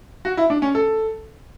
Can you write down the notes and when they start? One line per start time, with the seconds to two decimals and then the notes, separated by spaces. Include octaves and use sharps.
0.25 F#4
0.37 E4
0.50 D4
0.62 C#4
0.75 A4